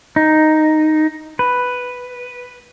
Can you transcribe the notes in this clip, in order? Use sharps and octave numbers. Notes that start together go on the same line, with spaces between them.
D#4
B4